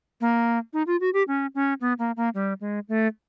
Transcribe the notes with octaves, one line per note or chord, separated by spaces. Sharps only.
A#3
D#4
F4
F#4
G4
C#4
C#4
B3
A#3
A#3
G3
G#3
A3